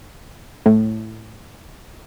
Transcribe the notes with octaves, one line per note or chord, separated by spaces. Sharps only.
A2